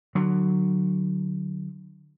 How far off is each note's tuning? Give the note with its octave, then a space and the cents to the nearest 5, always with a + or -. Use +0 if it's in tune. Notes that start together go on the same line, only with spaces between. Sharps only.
D3 +25 F#3 +0